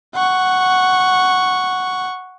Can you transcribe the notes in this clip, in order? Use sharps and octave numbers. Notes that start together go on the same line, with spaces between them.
F#5 C#6